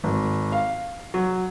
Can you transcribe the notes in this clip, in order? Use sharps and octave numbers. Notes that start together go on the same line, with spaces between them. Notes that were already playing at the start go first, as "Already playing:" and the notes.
G#1
F5
F#3